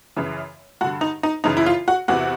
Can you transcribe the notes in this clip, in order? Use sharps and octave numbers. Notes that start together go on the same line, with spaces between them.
F#2 C#3 E3
G2 D3 F#4
D#4
D#4
F#2 C#3 E3 D#4
E4
F4
F#4
E2 C3 E3 F#4